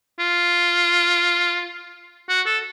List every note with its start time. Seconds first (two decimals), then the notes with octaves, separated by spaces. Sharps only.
0.19 F4
2.29 F#4
2.46 A4